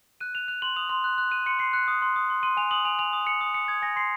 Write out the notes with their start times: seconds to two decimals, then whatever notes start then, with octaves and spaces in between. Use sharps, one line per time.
0.20 F#6 D#7
0.35 F#6 F7
0.48 F#6 F7
0.62 C6 F#7
0.76 D#6 F7
0.89 C6
1.04 F#6
1.18 F#6
1.31 F#6 D#7
1.46 C6 C#7
1.59 C6 C7
1.73 F#6 C#7
1.88 D#6
2.02 C6
2.16 D#6
2.30 C6
2.43 C6 D#7
2.57 G#5 F7
2.71 D#6 F#7
2.85 G#5 F7
2.99 G#5 F7
3.13 D#6
3.26 D#6 C#7
3.41 D#6
3.54 D#6 C#7
3.68 D#6 G#6
3.82 G#5 A#6
3.96 C6 C7